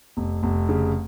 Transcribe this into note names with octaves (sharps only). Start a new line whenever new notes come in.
F1
F1
C#3